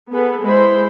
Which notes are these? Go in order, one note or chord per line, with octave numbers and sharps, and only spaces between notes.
B3 G#4 A4 B4
G#3 E4 C5 B5